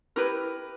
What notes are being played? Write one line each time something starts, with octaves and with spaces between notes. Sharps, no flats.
E4 G4 A#4 B4